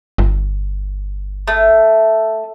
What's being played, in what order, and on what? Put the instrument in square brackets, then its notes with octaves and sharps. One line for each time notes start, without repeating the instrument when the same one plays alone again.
[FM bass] G1
[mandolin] A3